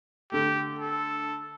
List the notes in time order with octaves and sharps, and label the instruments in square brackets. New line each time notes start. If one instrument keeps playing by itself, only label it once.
[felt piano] D3 A3 [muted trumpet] G4
[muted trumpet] A4